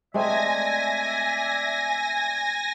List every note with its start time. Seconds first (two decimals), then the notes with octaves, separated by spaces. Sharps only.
0.14 G#3 A3 C4 D5 E5 G#5 A#6